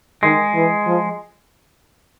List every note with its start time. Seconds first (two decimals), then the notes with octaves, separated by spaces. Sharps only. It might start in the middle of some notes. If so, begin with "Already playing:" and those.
0.23 D#3 G#3
0.55 E3
0.87 F3